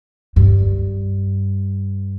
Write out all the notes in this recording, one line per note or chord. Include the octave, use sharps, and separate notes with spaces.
G2